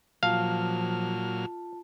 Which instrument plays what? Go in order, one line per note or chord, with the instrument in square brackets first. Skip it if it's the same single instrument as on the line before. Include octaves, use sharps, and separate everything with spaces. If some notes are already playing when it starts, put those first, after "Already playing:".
[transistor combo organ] A#2 F#3 F6 [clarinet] F3 [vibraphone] F4 A5 [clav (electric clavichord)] F5